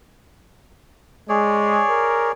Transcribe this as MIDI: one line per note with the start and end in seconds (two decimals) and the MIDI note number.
1.29 1.82 56
1.29 2.32 68
1.29 2.32 73
1.29 2.32 74
1.90 2.30 70